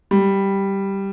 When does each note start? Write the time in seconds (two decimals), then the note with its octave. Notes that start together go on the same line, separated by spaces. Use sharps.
0.11 G3